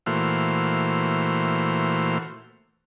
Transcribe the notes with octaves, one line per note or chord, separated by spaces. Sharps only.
A#2 E3 A3 F#4 C5 F6